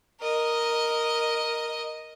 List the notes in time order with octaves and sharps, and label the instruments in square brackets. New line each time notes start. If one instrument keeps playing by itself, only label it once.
[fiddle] A#4 D#5